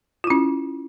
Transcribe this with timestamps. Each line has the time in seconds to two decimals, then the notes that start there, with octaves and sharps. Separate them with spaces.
0.24 F4
0.27 E4
0.30 C#4